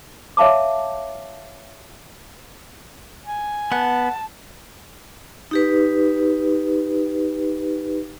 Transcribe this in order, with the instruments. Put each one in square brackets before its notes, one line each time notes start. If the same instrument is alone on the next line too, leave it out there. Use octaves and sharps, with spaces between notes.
[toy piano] C#5 E5 F5 A5 D6
[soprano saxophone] G#5
[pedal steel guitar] B3 [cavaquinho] F#5 [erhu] A5
[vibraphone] D#4 G4 B4